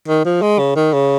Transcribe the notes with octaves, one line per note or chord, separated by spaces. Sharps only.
D#3
F3
G#3
C#3
D#3
C#3